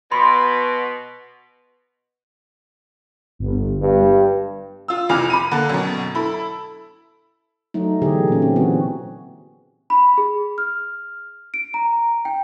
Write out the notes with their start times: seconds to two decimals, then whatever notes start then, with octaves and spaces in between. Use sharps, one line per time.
0.12 B2 B5 C6
3.39 G1
3.82 G2
4.88 F4 E6
5.09 C2 F2 G#5 D6 F6 F7
5.30 B5 D6 D#7
5.51 D3 A#3 A4 A5
5.69 F#2 B2
6.15 E4 A4 B5
7.74 F#3 A3 D#4
8.02 B2 D3 E3 G4 G#4
8.28 A#2 C#4
8.42 C4
8.56 E3 B3 C4 F#4
9.90 B5
10.18 G#4
10.58 F6
11.54 D7
11.74 A#5
12.25 G5